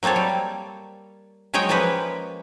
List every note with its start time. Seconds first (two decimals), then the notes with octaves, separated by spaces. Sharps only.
0.03 F#3 A#3 C4 A4 C#5
0.16 G3
1.54 F#3 G#3 C#5 D#5 G5
1.69 F3 G#3 A#3 C#4 B4